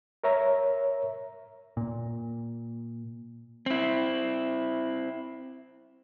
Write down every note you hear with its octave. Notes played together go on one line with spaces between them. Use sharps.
A#4 C#5 E5 A#5
A#2
C4 E4